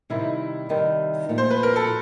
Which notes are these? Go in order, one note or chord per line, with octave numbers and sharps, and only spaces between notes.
C3 D#3 G3 C4 D#4 E4
C3 D#3 G3 C4 D#4
A#2 F3 A3
C5
B4
A#4
A4